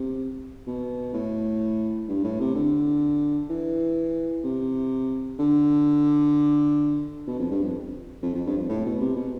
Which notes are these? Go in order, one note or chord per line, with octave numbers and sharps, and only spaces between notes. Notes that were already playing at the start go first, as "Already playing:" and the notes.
Already playing: C3
B2
A2
G2
A2
C3
D3
E3
C3
D3
B2
F2
G2
F2
F2
F2
G2
F2
A2
B2
C3
B2